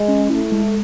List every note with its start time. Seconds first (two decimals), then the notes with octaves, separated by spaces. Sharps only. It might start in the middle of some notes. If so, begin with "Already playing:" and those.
Already playing: G#3
0.08 C#4
0.30 A3 E4
0.52 G#3